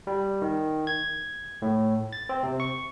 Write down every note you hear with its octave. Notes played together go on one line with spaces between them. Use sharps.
G3
D#3
G#6
A2
A6
C4
C3
C#6